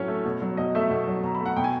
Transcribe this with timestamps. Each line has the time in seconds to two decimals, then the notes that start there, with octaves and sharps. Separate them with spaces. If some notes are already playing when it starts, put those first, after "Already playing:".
Already playing: A2 F#3 C#4 C#5
0.08 A3
0.25 B2
0.42 F#3
0.57 B2 D#5
0.75 A3 E5
0.90 B2
1.07 F#3
1.24 B2 A#5
1.35 B5
1.40 A3
1.46 F#5
1.57 B2 G5
1.64 G#5